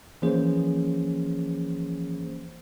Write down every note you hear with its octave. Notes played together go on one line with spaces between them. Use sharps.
E3 F3 A#3 C#4 G#4 C5